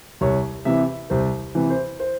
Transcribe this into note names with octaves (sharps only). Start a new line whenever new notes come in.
C2 C#5
C3 E3 E5
C2 C5
C3 E3
C5
C5